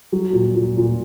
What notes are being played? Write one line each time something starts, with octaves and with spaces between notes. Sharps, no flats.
F#3
A#2
A#2
A#2